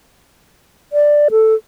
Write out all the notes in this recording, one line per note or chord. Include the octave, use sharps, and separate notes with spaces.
D5
A4